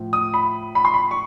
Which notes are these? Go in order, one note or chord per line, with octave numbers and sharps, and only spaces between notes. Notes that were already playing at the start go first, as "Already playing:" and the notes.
Already playing: A2 F3
D#6
B5
B5
C6
B5
C#6